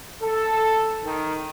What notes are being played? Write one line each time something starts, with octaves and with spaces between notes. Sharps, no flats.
A4
D#3